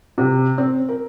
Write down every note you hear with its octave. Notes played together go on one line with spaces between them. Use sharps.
C3
C4
A#4